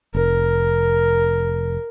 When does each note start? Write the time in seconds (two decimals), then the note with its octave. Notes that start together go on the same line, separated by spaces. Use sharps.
0.14 F1 A#4